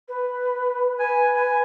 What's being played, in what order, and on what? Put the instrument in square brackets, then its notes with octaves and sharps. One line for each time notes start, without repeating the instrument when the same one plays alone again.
[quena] B4
[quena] B4 [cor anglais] G#5
[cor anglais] G#5